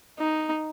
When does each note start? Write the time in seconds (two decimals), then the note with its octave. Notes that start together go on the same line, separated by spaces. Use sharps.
0.19 D#4